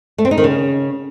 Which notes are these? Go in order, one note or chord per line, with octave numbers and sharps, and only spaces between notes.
A3
C4
D#4
D#3
C#3